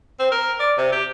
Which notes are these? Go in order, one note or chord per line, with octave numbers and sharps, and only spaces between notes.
C4
A#4
D5
C3
G4